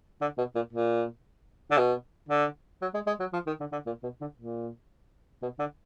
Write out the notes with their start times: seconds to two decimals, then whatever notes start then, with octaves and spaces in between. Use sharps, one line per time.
0.21 D3
0.38 B2
0.55 A#2
0.73 A#2
1.71 D3
1.78 B2
2.29 D3
2.81 F#3
2.94 G#3
3.07 G#3
3.20 F#3
3.33 F3
3.47 D#3
3.60 D3
3.72 D3
3.86 A#2
4.03 B2
4.21 D3
4.37 A#2
5.42 B2
5.59 D3